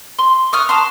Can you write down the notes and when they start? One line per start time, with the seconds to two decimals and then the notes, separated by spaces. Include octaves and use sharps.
0.19 C6
0.53 C#6 D#6 F6 F#6
0.69 A5 A#5 C6